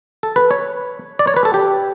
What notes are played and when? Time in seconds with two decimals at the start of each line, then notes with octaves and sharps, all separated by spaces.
0.23 A4
0.36 B4
0.51 C#5
1.19 D5
1.27 C#5
1.36 B4
1.45 A4
1.54 G4